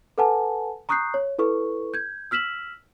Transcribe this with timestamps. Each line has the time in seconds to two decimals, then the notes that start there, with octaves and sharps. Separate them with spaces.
0.18 A4 B4 F#5 G#5 A5
0.89 A#5 C#6 D#6 F#6 G6 C7
1.14 C#5
1.38 E4 A4 B4 C#6
1.94 G6 G#6
2.31 E6 F6 B6 E7 F#7